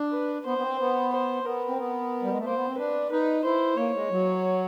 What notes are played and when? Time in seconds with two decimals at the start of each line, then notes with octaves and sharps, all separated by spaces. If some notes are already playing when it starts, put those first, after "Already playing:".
Already playing: D4
0.12 B4
0.46 B3 C5
0.58 B3
0.62 C4
0.79 B3
1.12 C5
1.45 B3 A#4
1.68 C4
1.78 B3
2.23 G3
2.31 G#3
2.38 A3
2.45 A#3 C5
2.56 B3
2.67 C4
2.78 D4 B4
3.11 D#4 B4
3.44 E4 C5
3.77 A#3 C#5
3.94 G#3
4.11 F#3